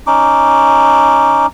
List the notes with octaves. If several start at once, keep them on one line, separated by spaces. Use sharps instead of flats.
C#4 D#4 D6